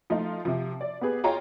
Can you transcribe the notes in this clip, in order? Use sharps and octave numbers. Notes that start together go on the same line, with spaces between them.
F3 A3 D#4 F4
C3 F3
D5
B3 G4 G#4 B4
F4 G#4 C#5 D#5 G5 A#5